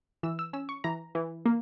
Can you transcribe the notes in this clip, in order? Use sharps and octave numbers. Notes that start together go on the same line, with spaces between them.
E3 E6
E6
C#4 E6
C#6
E3 A#5
E3
A#3